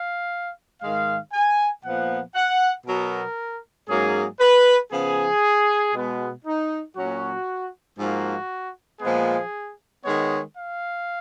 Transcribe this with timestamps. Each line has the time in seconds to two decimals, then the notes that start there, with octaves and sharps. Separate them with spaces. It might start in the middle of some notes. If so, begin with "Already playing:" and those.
Already playing: F5
0.81 G#2 D#3 G#3 F5
1.33 G#5
1.83 A#2 F3 B3 F#5
2.35 F#5
2.86 B2 F#3 B3 A#4
3.89 G#2 F#3 A#3 C#4 G#4
4.39 B4
4.91 C#3 F3 B3 G#4
5.93 B2 G#3 B3
6.45 D#4
6.95 A#2 F#3 C#4 F#4
7.98 G#2 F3 A#3 F#4
9.00 A#2 F3 G#3 B3 G#4
10.03 D#3 G#3 B3 C#5
10.55 F5